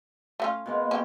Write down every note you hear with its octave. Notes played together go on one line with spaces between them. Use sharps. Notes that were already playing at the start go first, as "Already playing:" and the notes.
A3 C#4 F4
B2 G#3 A#3
C#4 G4